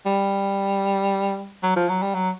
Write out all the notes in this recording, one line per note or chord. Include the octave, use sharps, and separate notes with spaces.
G3
F#3
F3
F#3
G3
F#3